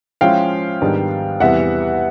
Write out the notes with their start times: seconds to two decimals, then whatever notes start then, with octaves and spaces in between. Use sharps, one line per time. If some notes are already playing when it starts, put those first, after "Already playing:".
0.21 F3 G#3 C#4 E4 F5 G5
0.81 G#2 D#3 G3 B3 D4
1.40 E2 C3 E3 G3 B3 E5 F#5